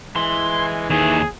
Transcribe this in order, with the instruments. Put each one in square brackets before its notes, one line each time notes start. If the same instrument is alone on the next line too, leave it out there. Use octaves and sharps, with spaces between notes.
[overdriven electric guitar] E3 [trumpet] G#3 [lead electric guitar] C6
[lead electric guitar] D#2 D#3 [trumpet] G#4